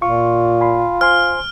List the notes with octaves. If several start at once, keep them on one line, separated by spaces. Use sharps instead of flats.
A#2 F4 C#6
G#5 B5 C6
C5 G#5 C6 F6